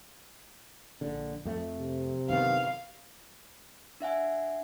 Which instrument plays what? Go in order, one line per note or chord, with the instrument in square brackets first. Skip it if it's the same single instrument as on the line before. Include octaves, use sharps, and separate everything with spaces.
[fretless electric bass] A#1 D3
F2 A3
[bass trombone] C3
[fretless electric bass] F#2 D#3 B3 [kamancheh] F5
[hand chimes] D4 E5 F#5 G#5